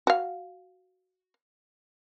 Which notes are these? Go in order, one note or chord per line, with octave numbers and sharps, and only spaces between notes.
F#4 F5